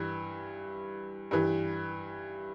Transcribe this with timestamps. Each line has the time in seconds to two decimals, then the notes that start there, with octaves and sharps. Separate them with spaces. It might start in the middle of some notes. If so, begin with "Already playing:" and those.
Already playing: G2 E3
1.31 G2 E3